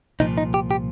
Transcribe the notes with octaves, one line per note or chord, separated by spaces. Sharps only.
C2 A#2 F3 D#4
D#4
G4
G4